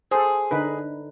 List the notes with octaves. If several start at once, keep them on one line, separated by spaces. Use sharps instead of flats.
G#4 A4 C5
D3 D#4 B4